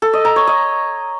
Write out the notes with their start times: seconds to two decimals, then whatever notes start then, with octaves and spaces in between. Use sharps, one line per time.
0.02 A4
0.13 D#5
0.25 A#5
0.36 C#5
0.47 D#5